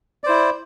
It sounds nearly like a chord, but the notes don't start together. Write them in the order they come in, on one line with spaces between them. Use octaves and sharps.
D5 C5 E4